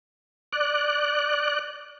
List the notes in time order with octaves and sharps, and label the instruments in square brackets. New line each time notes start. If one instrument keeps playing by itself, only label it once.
[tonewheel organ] D5 F#6